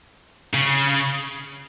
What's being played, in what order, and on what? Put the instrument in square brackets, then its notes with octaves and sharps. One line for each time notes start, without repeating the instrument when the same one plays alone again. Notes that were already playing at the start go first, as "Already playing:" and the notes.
[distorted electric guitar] C#3